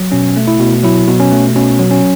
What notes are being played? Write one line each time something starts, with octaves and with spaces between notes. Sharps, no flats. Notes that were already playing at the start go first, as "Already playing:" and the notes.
Already playing: F#3
B2 C#4
A3
E4
B2
F#3 E4
B2
C#4
A3
B2 C#4
F#3
C#4